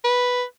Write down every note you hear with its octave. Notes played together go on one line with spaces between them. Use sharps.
B4